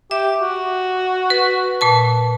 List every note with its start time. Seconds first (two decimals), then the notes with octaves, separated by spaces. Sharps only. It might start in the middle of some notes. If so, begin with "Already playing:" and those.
0.11 G4 E5
0.41 F#4
1.30 B4
1.81 A#2 B4 A5